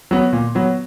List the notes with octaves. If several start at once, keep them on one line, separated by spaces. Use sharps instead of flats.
F#3 B3
A#2
F#3 B3